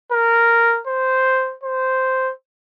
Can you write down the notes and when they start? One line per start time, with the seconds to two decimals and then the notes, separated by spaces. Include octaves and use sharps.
0.12 A#4
0.87 C5
1.64 C5